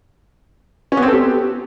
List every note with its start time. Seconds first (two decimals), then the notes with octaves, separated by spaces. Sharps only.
0.92 C#4
0.97 B3
1.02 C4
1.08 A4
1.13 G4